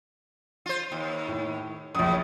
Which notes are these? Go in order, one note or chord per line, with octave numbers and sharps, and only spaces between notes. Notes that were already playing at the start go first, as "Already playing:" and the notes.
F4 C5
D#2
A2
A#1 F#2 C#3 D#6